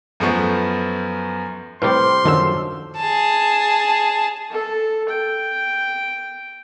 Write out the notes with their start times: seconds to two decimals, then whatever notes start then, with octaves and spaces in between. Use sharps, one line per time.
0.20 F#2 F3 A3 B3 C#6
1.82 A2 C3 G3 B4 C5 C6 D6 F6
2.25 F#2 D3 D#3 F3 E6
2.97 G#4 A5
4.51 A4
5.09 G5